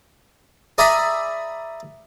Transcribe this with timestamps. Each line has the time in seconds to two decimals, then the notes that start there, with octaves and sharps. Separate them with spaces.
0.78 G#4 D5 E5 G#5 A#5 B5